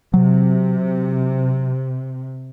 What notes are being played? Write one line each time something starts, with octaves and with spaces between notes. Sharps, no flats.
C3 F#3